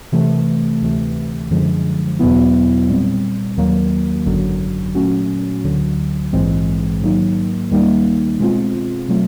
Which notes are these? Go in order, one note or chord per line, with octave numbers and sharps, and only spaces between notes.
C3 E3 A3
D2 C3 E3 A3
F#2 D3 F3 G#3
E2 B2 F#3 B3 E4
A#2 G3 C4
D#2 D#3 F#3 A#3
G#1 F#2 D3 F#3
A#2 F#3 A3 C#4 F#4
D2 D3 F#3
A#1 G#2 E3 G#3 C4
G#2 D#3 F#3 A#3 D#4
D#2 D#3 G3 A#3 D#4
B2 G#3 C4 F4
B2 F#3 A3 C4 F4